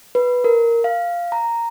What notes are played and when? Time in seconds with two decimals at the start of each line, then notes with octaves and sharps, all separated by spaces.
0.15 B4
0.44 A#4
0.84 F5
1.32 A#5